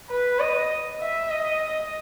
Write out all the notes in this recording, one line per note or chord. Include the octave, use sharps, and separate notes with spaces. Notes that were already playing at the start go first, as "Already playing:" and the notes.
B4
D#5
E5
D#5